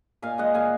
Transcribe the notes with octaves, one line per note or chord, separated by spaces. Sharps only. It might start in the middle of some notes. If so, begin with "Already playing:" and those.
A#2 F5 G#5
G#3 D#5 F#5
A#2 F5 G#5